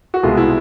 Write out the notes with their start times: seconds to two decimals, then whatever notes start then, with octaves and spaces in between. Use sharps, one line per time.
0.14 F#4
0.23 C2 B2 G#3 F4
0.37 E4